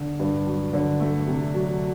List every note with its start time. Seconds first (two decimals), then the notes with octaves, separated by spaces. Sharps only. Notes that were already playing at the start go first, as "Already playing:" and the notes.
Already playing: D3
0.20 G2
0.46 F#3
0.73 D3
1.00 A3
1.27 C3
1.54 F#3